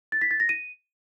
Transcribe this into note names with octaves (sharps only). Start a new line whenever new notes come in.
A6
B6
A6
A#6
D#7